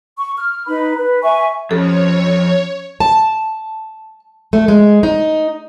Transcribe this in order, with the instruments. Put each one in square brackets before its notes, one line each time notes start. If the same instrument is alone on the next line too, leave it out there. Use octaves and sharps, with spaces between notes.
[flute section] C#6
F6
D#4 B4 B5
B4
E5 G#5 C#6
[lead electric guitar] F2 [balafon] C#4 G4 [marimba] A4 [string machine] C#5
[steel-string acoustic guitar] A5
A3
G#3
D#4